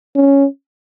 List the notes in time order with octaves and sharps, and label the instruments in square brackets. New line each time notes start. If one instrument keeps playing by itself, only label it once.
[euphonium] C#4